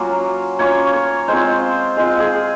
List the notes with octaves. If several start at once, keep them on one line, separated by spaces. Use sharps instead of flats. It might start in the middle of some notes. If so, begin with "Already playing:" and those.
Already playing: F#3 A#3 C#4 F4
A#3 C#4 F4 C#5
C#5
G#3 C4 F4 C5
G#3 C4 F4
G#4